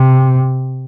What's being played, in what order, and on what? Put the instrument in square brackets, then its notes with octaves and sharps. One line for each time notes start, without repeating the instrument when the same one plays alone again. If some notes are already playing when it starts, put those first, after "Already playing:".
Already playing: [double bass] C3